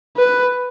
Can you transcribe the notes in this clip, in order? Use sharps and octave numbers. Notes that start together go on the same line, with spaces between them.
B4